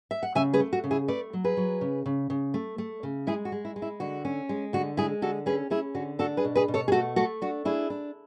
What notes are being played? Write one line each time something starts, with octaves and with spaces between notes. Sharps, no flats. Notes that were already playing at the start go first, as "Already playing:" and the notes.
E5
F#5
C#3 E5 G#5
G#4 B4
A3
F#4
C#3
E4 G#4
A3 B4 D5
F#3
G#4 B4
F#3
C#3
C#3
C#3
A3
A3
C#3
G#3 E4 G#4
F#4
G#3
E4
G#3
E4
D3 F#4
C#4
G#3
D3 F#4
G#3 E4 G#4
D3 F#4 A4
C#4 G#4 B4
C#4 E4 G#4
D3 F#4
D4 F#4 A4
G#4 B4
B2
G#4 B4
B2
A4 C#5
G#4
A3 F#4 A4
A3 F#4 A4
D4 F#4
D4 E4 G#4
D4